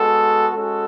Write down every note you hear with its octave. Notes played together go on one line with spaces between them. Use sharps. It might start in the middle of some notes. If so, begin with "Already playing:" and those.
Already playing: G#3 B3 F#4 A4
G#3 C#4 F#4 A4